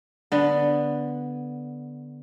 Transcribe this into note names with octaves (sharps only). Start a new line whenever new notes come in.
D3 B3